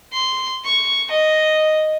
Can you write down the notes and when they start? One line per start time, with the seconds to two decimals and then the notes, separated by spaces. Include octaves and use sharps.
0.13 C6
0.65 C#6
1.11 D#5